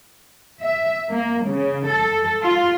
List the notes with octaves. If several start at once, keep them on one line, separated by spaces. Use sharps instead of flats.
E5
A#3
C#3
A4
F4